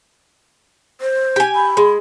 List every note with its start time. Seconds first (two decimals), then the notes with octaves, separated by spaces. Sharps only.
1.01 C5
1.36 G4 G#5
1.55 B5
1.77 G#3